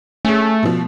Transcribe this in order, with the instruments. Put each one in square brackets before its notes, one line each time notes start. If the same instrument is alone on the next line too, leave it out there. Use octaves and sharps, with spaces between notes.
[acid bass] A3 [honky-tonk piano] C#4 G#4
[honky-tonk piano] B2 F3